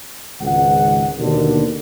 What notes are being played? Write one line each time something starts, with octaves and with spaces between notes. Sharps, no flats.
G#1 C#2 F#5
D#2 B2 D3